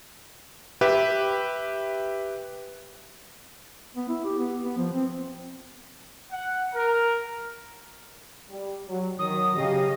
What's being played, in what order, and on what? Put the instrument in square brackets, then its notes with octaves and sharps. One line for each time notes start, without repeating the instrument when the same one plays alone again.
[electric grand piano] G4 B4 E5
[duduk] B3
E4
G4
B3
B3
F3
C4
[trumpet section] F#5
A#4
[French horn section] G3
F#3
[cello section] D#3 [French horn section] F#3 [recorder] D#6
[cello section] C#3 D#5 F5 [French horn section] F#3 G4